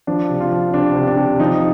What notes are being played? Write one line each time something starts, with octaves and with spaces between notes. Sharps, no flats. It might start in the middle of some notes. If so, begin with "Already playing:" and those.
F3 D4
C3
F4
F3
C3 D4
C3
D4
C3
F3 D#4